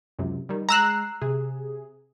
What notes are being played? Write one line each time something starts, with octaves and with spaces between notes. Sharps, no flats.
C#2 F#2 C3
D#3 G3
G#3 A#5 E6 F#6 C7
C3 G#4